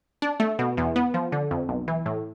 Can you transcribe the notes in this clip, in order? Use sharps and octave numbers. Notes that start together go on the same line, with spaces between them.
D4
A3
B2
E2
B3
F3
D3
F2
B1
E3
A2